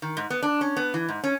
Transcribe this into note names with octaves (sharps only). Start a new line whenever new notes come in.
D#3
G#2
B3
D4
C#4
B3
E3
G#2
C#4